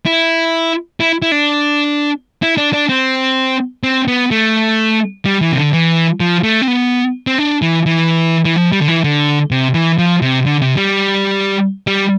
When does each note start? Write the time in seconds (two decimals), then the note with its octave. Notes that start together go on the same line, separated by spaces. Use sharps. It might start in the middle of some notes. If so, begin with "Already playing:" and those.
0.06 E4
1.00 E4
1.22 E4
1.32 D4
2.42 E4
2.57 D4
2.73 D4
2.89 C4
3.83 C4
4.08 B3
4.31 A3
5.26 G3
5.41 E3
5.52 C3
5.57 D3
5.73 E3
6.20 F3
6.43 A3
6.62 C4
6.68 B3
7.27 C4
7.38 D4
7.62 E3
7.86 E3
8.45 E3
8.56 F3
8.72 G3
8.81 D3
8.88 E3
9.04 D3
9.51 C3
9.74 E3
9.98 F3
10.22 C3
10.46 D3
10.62 C3
10.77 G3
11.87 G3